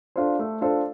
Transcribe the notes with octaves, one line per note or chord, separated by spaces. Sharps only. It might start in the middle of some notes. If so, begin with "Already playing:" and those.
D4 F4 A4 C5
A3
D4 F4 A4 C5